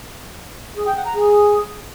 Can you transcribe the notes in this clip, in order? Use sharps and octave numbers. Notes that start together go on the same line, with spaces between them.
G#4
G5
F#5
A#5
G#4